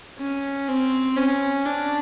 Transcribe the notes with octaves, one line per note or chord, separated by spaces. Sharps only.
C#4
C4
C#4
D4